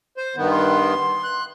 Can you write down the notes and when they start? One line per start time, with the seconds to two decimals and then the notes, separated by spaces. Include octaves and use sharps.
0.17 C5
0.36 G2 D#3 B3
0.51 C6
1.24 F#6